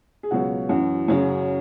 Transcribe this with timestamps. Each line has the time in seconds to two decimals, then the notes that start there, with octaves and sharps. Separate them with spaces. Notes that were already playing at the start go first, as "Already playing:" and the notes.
0.23 G#4
0.31 C#2 B2 F#3 F#4
0.69 F#2 E3 F#4
1.08 F#2 C#3 F#3